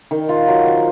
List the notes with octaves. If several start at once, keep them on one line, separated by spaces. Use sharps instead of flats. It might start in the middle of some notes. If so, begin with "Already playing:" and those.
D#3
F4
F#3
C5